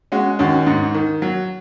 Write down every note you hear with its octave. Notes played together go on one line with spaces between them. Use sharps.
G#3 C#4 F#4
D#2 C#4 F#4
G#2
D#3
F#3